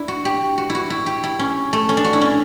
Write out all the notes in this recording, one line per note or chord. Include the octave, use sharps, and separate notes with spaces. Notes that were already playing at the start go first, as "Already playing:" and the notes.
Already playing: D4 E4
F#4
G4
F#4
E4
F#4
E4
G4
E4
C#4
A3
C#4
D4
F#4
E4
C#4